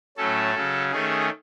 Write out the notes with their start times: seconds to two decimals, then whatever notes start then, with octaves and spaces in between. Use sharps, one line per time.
0.17 A2 F#3 A3 C#4 A4
0.55 C#3 F#3 C#4
0.92 D#3 A3 C#4 G#4